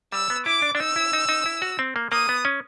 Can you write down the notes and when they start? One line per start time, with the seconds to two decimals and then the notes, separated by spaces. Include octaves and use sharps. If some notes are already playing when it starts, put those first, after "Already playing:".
0.12 G3 E6
0.30 B3
0.46 E4 D6
0.62 D4
0.75 D4
0.80 D#4 E6
0.96 E4
1.13 D#4
1.29 D#4
1.46 E4
1.62 F#4
1.79 C4
1.96 A#3
2.12 A#3 D#6
2.29 B3
2.45 C#4